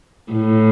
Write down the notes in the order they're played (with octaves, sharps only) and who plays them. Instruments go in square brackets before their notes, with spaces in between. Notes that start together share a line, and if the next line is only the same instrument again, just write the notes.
[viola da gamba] A2